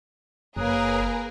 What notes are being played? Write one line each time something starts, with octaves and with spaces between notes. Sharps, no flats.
F#1 A#3 G#4 A#4 B4 C#5 D#6 F#6